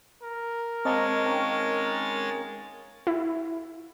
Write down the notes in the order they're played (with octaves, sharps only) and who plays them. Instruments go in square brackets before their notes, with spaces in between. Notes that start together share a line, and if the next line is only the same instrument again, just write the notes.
[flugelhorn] A#4
[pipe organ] G#3 C#5 A6 [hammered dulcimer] A#3 [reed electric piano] C4 D#5 A5
[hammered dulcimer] D#3 C#4 G5
[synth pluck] E4